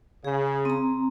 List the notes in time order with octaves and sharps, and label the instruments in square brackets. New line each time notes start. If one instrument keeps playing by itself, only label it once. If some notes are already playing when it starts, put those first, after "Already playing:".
[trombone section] C#3 [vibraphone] G#4
[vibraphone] C4 A#5